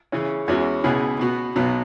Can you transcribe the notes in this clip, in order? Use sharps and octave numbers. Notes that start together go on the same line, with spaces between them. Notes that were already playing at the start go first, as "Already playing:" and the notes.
C#3 E3 C#4
E2 E3 G#3 C#4 F#4
C#2 B2 B3 E4 G#4
B2 B3 F#4
B1 B2 F#3 B3